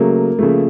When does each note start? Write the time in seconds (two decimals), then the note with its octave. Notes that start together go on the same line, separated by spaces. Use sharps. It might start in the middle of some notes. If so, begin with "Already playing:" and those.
Already playing: C#3 F#3 A3 A#3
0.39 C#3 F3 A3